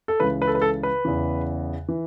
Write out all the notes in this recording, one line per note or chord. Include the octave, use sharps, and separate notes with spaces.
A4
C#2 C#3 E3 B4
B4
A4
B4
A4
B4
E2 C#3 E3
E3